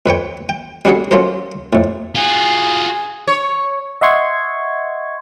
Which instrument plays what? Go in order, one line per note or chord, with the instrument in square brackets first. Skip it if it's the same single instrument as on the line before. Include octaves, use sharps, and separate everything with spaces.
[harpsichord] F2 B4 C#5 G5
G5
G3 C#4 D4 F#4 G#4 A4
F#3 C#4 F4 A4 A#4 C5
F2 A2
[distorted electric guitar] F4 F#4 [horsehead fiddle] G#4
[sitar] C#5
[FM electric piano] D#5 E5 F#5 C6 C#6 G#6